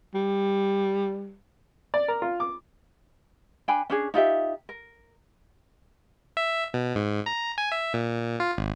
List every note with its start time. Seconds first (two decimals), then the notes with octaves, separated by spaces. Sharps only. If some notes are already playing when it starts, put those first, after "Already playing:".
0.14 G3
1.94 D5
2.08 A#4
2.22 F4
2.40 D6
3.68 D4 G5 G#5 B5
3.90 C#4 D4 G#4
4.14 D#4 F4 G4 E5
4.69 A#4
6.37 E5
6.74 B2
6.95 G#2
7.26 A#5
7.58 G#5
7.72 E5
7.94 A#2
8.40 F4
8.58 G#1